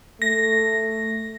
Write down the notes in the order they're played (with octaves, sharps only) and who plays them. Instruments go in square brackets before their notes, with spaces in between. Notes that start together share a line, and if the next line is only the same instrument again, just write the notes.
[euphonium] A3 [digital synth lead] A#6